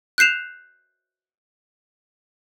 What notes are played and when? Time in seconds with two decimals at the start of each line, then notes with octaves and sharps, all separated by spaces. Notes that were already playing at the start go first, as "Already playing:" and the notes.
0.18 F#6 G6 C7 E7 F7